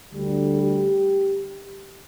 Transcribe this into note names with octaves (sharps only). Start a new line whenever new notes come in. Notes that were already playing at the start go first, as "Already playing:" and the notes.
D2 D3 G3
G4